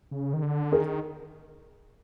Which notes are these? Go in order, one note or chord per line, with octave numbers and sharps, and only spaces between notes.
C#3
D#3
D3
D#3 G#4 A#4